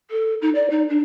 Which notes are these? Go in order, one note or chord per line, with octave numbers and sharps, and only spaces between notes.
A4
D#4
D5
D#4
D4